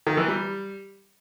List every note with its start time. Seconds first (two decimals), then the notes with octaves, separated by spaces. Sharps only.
0.07 D#3
0.17 E3
0.28 G3